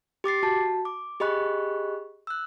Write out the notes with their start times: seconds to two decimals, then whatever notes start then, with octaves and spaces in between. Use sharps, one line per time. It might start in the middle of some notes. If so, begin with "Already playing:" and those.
0.24 G4 D6 A6 C7
0.43 F#4 A5
0.85 D6
1.20 G4 G#4 D#5 B5 C#6 F#6
2.27 E6 F#6